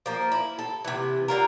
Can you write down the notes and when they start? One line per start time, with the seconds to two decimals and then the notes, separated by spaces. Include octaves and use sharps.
0.06 F3 A#3
0.32 E4
0.59 A4
0.85 C3 E3
1.28 D3 F4 A#4